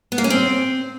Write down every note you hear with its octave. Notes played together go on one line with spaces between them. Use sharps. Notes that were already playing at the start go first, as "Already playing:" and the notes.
B3
A#3
C#4
C4